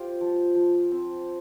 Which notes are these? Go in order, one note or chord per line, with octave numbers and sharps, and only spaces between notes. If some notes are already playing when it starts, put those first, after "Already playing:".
Already playing: F4 G4 C5
F3
F3
C4